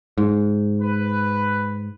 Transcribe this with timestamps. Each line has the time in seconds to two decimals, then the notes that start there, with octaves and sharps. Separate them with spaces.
0.18 G#2
0.82 B4